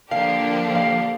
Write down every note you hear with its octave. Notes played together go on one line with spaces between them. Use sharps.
D3 F3 A#3 D4 G4 F5
F5